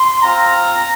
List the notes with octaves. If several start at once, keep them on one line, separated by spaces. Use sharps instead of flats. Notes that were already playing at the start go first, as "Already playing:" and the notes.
Already playing: C6
C4 F4 A#5